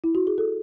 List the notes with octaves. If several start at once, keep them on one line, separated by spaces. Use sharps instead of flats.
E4
F#4
G#4
A4